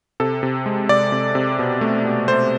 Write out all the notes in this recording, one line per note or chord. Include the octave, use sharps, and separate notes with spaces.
C3 A4
C3
G#3
C3 D5
C3
C3
B2
A3
B2
A3 C5